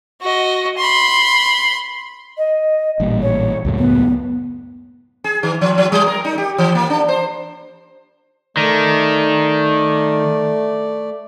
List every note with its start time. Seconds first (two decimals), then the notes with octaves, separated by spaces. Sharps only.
0.22 F#4 D#5
0.77 B5 C6
2.38 D#5
3.00 A1 A#2 G3
3.22 C#5
3.65 C#2 F#2 A2
3.78 B3
5.24 G#4
5.43 D#3
5.61 F3
5.78 F3
5.92 G3
6.07 A#4
6.25 D#4
6.38 G4
6.58 E3
6.75 A#3
6.90 D4
7.08 C5
8.57 D#3 A3 D5